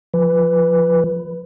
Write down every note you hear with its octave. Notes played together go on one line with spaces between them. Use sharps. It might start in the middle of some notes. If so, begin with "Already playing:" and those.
F3 B4